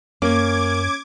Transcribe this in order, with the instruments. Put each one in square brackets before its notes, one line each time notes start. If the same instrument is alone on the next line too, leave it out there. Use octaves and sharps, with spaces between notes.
[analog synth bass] F#2 [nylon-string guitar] A#3 [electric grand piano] C#4 [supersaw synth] D6 G#6